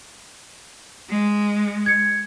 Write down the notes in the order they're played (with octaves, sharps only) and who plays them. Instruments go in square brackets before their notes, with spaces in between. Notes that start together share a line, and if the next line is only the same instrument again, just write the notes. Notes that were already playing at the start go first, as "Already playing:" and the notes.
[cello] G#3
[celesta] G#6 C#7